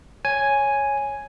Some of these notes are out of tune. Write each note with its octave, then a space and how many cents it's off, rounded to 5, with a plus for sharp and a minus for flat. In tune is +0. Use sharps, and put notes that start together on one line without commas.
C#5 +0 G#5 +0